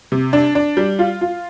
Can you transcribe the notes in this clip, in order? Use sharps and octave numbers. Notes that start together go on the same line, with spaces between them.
C3
D4
D4
G3
F4
F4